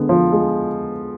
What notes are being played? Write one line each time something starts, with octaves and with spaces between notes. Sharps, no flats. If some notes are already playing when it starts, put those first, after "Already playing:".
Already playing: D3 G#3 B3
F3
G#3